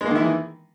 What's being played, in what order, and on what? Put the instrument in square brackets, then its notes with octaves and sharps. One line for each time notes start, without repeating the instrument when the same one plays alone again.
[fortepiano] G#3
A#3
D#3
E4
E3